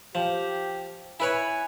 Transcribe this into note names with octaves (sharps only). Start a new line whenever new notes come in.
F3 G4
E4 B4 C#5 G#5